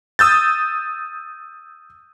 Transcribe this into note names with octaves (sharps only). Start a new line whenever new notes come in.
D#6 E6 G6 A6